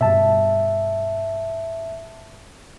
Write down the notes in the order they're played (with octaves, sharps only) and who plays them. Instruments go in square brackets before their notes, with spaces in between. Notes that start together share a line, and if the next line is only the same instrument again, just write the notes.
[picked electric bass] G2 B2 [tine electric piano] E5 A5